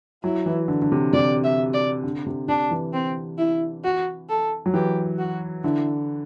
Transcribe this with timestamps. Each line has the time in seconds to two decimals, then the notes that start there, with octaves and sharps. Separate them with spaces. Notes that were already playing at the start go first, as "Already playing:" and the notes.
0.23 F#3 E4
0.46 E3
0.68 D3
0.82 D3
0.92 C3
1.13 C3 D5
1.44 E5
1.73 D5
2.03 D3
2.26 C3
2.48 C3 D4
2.71 E3
2.93 C4
3.38 E4
3.84 F#4
4.29 A4
4.66 F#3
4.74 E3 G4
5.19 F#4
5.63 D3 E4